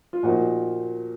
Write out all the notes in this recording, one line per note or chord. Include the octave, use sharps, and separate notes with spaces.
F4
A#2 F3 A#3 D#4 F#4